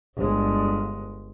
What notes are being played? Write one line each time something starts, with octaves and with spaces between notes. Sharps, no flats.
G1 G#3